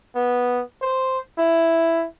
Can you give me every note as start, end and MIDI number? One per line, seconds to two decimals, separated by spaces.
0.15 0.62 59
0.82 1.19 72
1.38 2.06 64